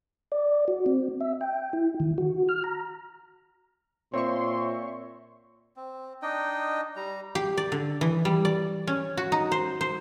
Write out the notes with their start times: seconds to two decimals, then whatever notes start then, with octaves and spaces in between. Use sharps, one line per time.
0.32 D5
0.68 F#4
0.86 C4
1.21 E5
1.41 G5
1.73 E4
2.00 D#3
2.18 F#4
2.49 F6
2.64 A#5
4.14 A#2 C4 C#5 E5 C6 C#6
5.76 C4
6.22 D4 D#4 D#5 G5
6.96 G3 A#5
7.35 G4
7.57 D5
7.72 D3
8.01 E3
8.25 G3
8.45 D5
8.87 C#4
9.17 F#4
9.32 D#4
9.52 C5
9.81 C5